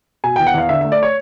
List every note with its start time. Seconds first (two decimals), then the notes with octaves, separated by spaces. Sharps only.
0.24 B2 G#5
0.36 E2 G5
0.47 F#5
0.54 E2 F5
0.69 D3 E5
0.81 A3 E5
0.92 D5
1.03 C#5